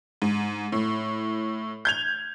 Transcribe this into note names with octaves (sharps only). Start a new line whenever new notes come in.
G#2
A2
G6 G#6 F7